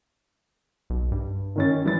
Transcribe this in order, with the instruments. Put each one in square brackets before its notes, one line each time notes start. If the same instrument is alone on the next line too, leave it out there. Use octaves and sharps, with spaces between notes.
[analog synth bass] B1
G2
[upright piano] D#3 C#4 A6
[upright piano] E3 A6 [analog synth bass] G3